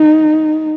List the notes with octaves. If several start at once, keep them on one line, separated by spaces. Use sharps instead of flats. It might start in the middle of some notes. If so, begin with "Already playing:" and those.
Already playing: D#4